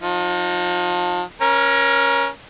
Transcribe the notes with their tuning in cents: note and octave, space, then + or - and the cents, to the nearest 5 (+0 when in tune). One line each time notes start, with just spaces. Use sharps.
F3 +35 D#4 +0
C#4 +0 A#4 +30